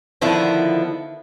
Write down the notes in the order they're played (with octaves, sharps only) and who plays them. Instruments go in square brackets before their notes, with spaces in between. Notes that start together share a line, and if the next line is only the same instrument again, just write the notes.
[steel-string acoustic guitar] D3 D#3 F3 B3 E4